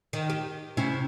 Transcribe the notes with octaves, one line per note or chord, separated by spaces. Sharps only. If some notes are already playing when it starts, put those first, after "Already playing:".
D#3
G4
C3 C#4 E4